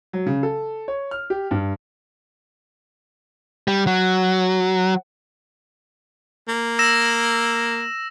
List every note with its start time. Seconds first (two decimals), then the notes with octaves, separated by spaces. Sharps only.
0.13 F#3
0.26 C#3
0.43 A4
0.88 C#5
1.11 F6
1.30 G4
1.51 G2
3.68 G3
3.87 F#3
6.48 A#3
6.79 E6 A#6 E7